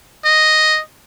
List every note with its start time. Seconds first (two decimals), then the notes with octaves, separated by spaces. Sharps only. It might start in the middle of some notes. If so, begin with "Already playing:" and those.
0.25 D#5